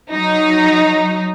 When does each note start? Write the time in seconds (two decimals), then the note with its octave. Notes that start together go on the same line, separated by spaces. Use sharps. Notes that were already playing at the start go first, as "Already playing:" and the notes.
0.11 F#3 D#4